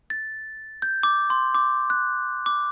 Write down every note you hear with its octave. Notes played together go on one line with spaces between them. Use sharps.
A6
G6
D6
C6
D6
F#6
D6